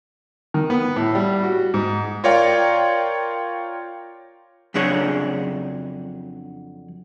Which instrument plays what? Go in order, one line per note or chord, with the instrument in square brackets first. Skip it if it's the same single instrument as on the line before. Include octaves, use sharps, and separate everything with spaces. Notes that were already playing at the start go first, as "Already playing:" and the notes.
[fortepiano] D#3
B3
A2
G3
F#4
G#2
[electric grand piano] F4 A#4 C#5 D5 F5 G5
[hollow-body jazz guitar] F2 C#3 F#3 D4 G#4 C#5